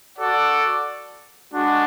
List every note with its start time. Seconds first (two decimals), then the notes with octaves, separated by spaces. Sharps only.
0.17 F#4 A4 D5 F#5
1.52 G#3 D4 F#4